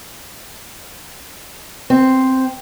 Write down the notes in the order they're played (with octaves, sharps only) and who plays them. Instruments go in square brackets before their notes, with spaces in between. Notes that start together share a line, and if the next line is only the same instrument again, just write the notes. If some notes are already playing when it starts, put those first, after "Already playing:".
[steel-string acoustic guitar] C4